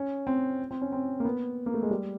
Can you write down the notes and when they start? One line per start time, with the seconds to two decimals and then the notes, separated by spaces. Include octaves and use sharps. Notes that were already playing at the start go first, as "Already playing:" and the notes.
Already playing: C#4
0.27 C4
0.71 C4
0.82 C#4
0.92 C4
1.20 A#3
1.25 B3
1.66 A#3
1.74 A3
1.82 G#3
1.91 G3